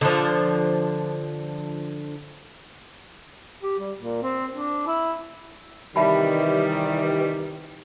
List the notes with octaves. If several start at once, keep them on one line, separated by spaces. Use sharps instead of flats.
D3 F3
G4
G3
A#2
C4
D4
E4
C3 D#3 E3 G3 E5 A5 B5